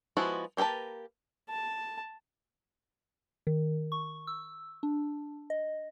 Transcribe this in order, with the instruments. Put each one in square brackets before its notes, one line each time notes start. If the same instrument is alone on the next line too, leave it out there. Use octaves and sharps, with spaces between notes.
[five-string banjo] F3 G#3 B3 E4 F#4
A#3 G4 A#4 B4 A5
[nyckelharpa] A5
[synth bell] D#3
C#6
E6
D4
D#5